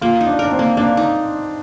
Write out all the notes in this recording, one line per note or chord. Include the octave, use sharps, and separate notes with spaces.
A#3 F4
D#4
D4
D4 A#4
C4
A#3
A#3 D4
D#4